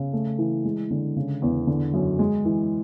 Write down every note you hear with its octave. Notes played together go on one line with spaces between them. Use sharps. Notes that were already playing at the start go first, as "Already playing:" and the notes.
Already playing: C#3
A3
E3
G#3
D3
C#3
E2
D3
F#2
G#3
E3